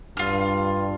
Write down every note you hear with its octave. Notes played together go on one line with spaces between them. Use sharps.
G2 F4 F6